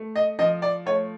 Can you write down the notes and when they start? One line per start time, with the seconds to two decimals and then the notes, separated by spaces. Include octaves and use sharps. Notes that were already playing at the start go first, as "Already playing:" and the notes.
Already playing: A3
0.16 D#5
0.39 F3 D#5
0.62 D5
0.86 A3 C#5